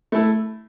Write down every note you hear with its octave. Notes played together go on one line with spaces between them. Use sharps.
A3 E4 A4